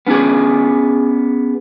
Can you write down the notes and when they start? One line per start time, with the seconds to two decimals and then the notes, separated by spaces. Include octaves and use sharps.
0.07 B3 C#4 D4 F4 G#4